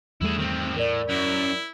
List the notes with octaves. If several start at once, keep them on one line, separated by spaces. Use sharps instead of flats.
E2 G3 A3 E4 G#4
D#3 C4
A2 A#4 D5
F#2 E4